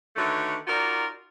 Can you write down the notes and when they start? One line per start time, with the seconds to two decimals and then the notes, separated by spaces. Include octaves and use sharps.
0.16 D3 D#3 A3 F#4 B4 C#5
0.67 D#4 F4 F#4 A#4 D5